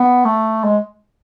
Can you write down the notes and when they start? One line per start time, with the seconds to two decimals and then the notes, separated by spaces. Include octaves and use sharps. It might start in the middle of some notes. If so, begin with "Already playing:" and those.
Already playing: B3
0.25 A3
0.64 G#3